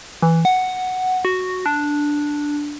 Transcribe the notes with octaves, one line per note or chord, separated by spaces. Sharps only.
E3
F#5
F#4
D4